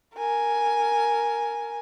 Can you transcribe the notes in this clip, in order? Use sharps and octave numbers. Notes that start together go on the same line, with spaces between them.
A#4 G#5